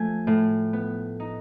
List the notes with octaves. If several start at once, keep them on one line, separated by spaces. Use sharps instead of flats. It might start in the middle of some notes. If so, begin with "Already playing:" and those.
Already playing: F3 A3 G#5
A2
B3
D#4